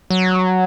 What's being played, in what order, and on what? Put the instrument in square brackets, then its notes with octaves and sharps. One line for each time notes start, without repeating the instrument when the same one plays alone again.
[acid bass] F#3